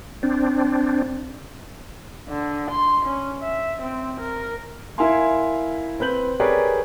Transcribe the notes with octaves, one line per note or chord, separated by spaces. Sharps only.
C4 D4
D3
C6
C#4
E5
C4
A#4
E4 A#4 E5 F5 G#5 C6
C4 B4 G6 F#7
G4 G#4 A#4 B4 C#5 D5